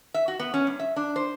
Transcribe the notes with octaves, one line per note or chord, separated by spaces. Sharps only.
E5
F#4
B3
C#4
G2
E5
D4
C5